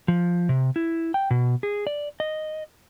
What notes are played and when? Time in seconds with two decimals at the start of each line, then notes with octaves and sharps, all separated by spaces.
0.08 F3
0.49 C3
0.76 E4
1.14 G5
1.31 B2
1.63 G#4
1.87 D5
2.20 D#5